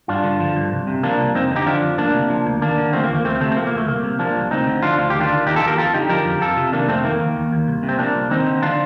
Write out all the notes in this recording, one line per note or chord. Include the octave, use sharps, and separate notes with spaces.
G2 D4 F4
D3
F3
G2
C2
C3
F3 A#3 D4
C2
F2 C4 D#4
D3 D#4 G4
F3 D4 F4
F2
D2 A#3 D4
C3
F3
D2
D#2 A#3 D4
D3
F3 A3 C4
A#3
D#2
A#3
D2 A3 C4
C3 A3 C4
C4
F3 A#3
A#3
D2
A3
C2 A#3
C3
F3 A#3 D4
C2
D2 C4 D#4
D3
F3 D4 F4
D2 F4
D#3 G4
D4 F4
D#3
D#2 D#4 G4
F4 A4
D#2
G4 A#4
F2 F4 A4
D3 D#4 G4
F3 G4 A#4
F2
F2 F4 A4
C3
D#3 A#3 D4
F2 A3 C4
D#3 A#3
D#3
D#2
D#2
C2
C3
C4
F3 A#3 D4
C2
D#2 C4 D#4
D3
F3 D4 F4